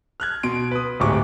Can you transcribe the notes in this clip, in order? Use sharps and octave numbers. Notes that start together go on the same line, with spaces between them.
F6 F#6 G#6
B2 C6 D7
B4 D#6
D1 G#2 G4 C#6 D6